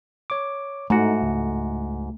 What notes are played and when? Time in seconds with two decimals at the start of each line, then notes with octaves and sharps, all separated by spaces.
0.30 C#5 D6
0.90 G#2 A3 D#4 F#4
1.22 C#2